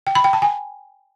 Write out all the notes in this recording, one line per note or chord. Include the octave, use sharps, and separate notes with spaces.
G5
B5
G5
A5
G#5